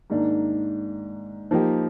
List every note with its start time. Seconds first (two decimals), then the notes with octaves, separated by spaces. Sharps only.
0.10 G#2 D#3 A#3 D4
1.51 F3 A#3 D#4 G4